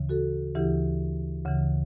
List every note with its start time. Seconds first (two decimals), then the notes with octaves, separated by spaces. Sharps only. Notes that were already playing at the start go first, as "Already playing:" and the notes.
Already playing: D2 C#3 E3
0.09 F#4 A4
0.55 D2 C#3 E3 E4 G4
1.45 D2 C#3 E3